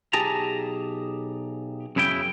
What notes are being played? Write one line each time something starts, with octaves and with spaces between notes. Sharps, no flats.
B1 G4 G#4 A5 A#5
F#2 C#3 E4 G#4 G5